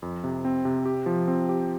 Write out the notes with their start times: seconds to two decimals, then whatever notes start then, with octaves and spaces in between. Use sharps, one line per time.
0.02 F2
0.24 C3
0.45 C4
0.65 C3
0.85 G4
1.06 F3
1.28 C4
1.49 G4